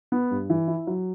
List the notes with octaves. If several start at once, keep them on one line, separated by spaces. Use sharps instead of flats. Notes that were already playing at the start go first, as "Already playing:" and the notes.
B3
G2
E3
E4
F#3